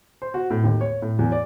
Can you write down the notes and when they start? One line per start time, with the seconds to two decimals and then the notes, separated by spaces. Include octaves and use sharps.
0.22 C5
0.34 F#4
0.50 A2
0.64 D#2
0.81 C#5
1.02 A2
1.19 E2
1.32 D5